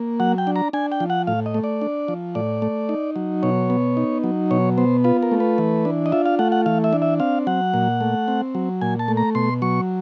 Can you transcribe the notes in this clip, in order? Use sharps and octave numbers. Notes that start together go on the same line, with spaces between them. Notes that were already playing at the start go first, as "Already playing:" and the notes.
Already playing: A#3
F#3 F#5
G5
D4
A#5
D4 G#5
G5
F3
F#5
A2 F5
D#5
A3
D5
D4
F3
A2 D5
A3
D#4
F#3
B2 C#5
B3
D#4
F#3
B2 C#5
B3 C5
F4 B4
A#4
A3
B4
E3
D4
D#5
F4 E5
F5
A3 F#5
F#5
E3 F5
E5
D4
E5
C4 F5
F#3 F#5
A#2
A3
C4
F#3
A#2 G#5
A5
A3
A#5
B2 C6
F#3 C#6